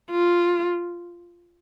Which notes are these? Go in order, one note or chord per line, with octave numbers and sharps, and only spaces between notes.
F4